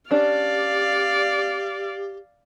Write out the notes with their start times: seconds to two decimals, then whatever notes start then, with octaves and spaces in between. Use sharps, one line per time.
0.11 C#4 D4 G4 D5 F5